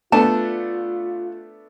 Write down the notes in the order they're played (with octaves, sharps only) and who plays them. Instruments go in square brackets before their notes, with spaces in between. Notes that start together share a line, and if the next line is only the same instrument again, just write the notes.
[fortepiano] A3 B3 D4 [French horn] F4 [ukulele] A5